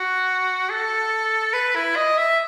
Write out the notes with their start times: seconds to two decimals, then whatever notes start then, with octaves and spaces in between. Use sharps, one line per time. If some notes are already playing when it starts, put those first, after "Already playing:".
Already playing: F#4
0.70 A4
1.54 B4
1.76 E4
1.96 D#5
2.18 E5